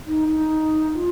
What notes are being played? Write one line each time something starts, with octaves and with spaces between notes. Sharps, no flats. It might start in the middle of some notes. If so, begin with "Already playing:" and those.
D#4
D#4
F4